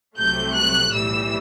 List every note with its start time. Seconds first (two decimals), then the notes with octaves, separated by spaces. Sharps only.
0.17 C2 C3 F#3 A3 G6
0.54 F#6
0.92 B1 A2 E3 G3 E6